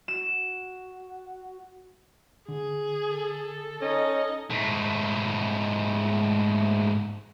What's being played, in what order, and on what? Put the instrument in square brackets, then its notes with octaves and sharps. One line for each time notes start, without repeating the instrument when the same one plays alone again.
[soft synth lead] F#4 [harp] E7
[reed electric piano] D3 [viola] G#4
[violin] A4
[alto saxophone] C#4 [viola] D#4 D#5
[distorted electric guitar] G#2 A3